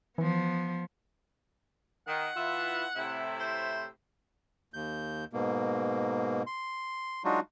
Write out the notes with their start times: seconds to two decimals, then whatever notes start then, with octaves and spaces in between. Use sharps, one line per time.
0.18 E3 F3 B3
2.07 D#3 F#5
2.36 E3 F4 E5
2.96 A2 C3 E4
3.39 C5
4.74 D#2 G6
5.33 G#2 B2 A#3
6.47 C6
7.24 F#3 G#3 D4 D#4 F4 F#4